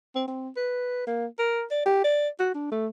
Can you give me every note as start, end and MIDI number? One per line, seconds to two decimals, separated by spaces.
0.15 0.25 60
0.28 0.49 60
0.57 1.03 71
1.07 1.26 58
1.39 1.63 70
1.71 1.81 74
1.86 2.03 67
2.04 2.29 74
2.40 2.51 66
2.55 2.70 62
2.72 2.87 57